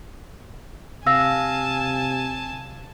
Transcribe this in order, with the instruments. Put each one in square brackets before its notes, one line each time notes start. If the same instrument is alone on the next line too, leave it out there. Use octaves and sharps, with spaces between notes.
[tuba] C3 [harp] F5 [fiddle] G#5 A5 [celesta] E6 A#6